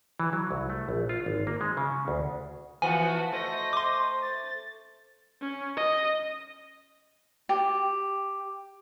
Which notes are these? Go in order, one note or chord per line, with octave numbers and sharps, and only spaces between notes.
E3
F#3
C2
A3
A#1
F4
G#1
A#3
G#3
C#3
D2
E3 F3 B3 F#4 B4 G#5
A3 C5 D#5 A#6
C6 D6
A6
C#4
D#5
G4